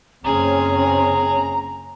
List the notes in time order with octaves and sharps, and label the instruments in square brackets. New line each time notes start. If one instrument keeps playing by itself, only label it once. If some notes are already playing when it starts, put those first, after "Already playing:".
[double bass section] F#1 C4 C#4 [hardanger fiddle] G#4 [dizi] A#5